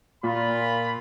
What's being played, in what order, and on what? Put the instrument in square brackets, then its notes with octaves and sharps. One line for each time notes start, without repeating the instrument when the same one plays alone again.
[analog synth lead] A#2 [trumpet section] F4 B5